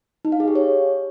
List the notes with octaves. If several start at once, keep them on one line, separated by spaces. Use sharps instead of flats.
D#4
F5
G#4
G4
C#5